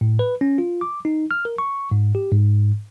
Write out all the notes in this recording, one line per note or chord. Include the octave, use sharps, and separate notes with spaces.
A2
B4
C#4
F4
D6
D#4
F6
A#4
C#6
G#2
G4
G#2